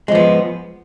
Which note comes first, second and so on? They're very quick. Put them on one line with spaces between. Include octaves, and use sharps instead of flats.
G#3 F3 B3